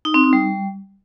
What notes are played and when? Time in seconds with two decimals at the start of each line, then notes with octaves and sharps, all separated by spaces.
0.05 D#4
0.14 C4
0.24 D#4
0.33 G3